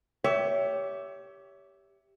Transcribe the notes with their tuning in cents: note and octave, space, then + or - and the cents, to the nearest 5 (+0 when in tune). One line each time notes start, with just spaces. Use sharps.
G4 +0 C#5 +25 E5 +0